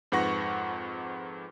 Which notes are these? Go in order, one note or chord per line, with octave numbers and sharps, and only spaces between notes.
F2 G#2 B4 F#5 C#6 A#6